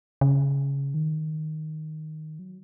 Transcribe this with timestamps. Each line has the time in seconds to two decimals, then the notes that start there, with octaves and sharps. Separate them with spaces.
0.21 C#3
0.94 D#3
2.39 F#3